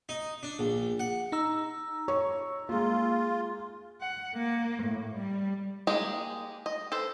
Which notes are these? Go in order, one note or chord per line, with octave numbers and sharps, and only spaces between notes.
D#4
D4
A#1
F#5
D#4 A#5 E6
C#5 C#6
G#3 A#3 F4
F#5
A#3
A2
G3
G#3 A#3 G4 G#4 D#5
D#5
A4 B4 C5